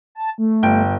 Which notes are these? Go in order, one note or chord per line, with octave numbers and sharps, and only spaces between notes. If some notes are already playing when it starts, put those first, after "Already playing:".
A5
A3
G1 G5